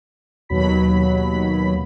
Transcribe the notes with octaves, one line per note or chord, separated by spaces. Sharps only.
D#2 B2 F#3 B5 B6